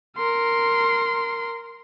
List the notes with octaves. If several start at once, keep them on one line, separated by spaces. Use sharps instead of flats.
A#4 C6